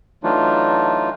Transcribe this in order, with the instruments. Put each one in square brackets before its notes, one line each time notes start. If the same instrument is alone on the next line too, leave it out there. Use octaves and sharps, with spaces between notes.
[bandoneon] E3 F#3 A3 D4 D#4 F4